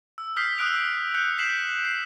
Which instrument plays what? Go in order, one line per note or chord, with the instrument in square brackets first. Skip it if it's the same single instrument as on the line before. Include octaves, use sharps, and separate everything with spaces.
[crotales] E6
D#6 F6 G6 B6 C7
D#6 E6 F#6 D7 F7
F#6 G6 C#7
B6 C7 E7 F#7
C7